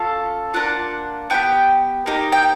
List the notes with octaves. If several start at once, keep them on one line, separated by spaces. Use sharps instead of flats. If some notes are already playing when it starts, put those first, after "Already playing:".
Already playing: C#4 F4 A4 F5
A#3 D4 F4 F#5
B3 D4 G4 G5
A#3 D#4 G4
G5